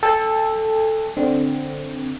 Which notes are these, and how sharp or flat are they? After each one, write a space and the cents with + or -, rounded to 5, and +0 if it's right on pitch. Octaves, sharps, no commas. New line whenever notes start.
A4 +0 G5 +45
D3 +0 C4 +0